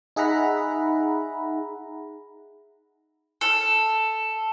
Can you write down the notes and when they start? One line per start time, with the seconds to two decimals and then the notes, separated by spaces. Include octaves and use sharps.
0.16 D#4 G#4 E5 F#5 A#5 B5
3.41 A4